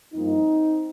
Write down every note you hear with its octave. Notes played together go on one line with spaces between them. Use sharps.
G2 F3 A#3 C4 D#4